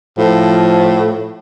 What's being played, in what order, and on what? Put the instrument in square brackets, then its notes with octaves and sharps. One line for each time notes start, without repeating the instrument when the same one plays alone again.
[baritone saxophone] A2 [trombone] F3